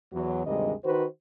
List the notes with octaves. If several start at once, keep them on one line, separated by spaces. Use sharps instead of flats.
E2 F#3
D2 G2 C3 D#3 G#3 D#5
D#3 F#4 B4 C5